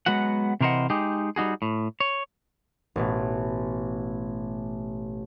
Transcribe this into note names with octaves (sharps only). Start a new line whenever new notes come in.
F#3 G#3 B3 F#4 F#5
C3 E3 A#4 C5 D#5 F#5
G#3 D#4 G4 G#4
G3 D#4 F#4 G#4
A2
C#5
A1 B2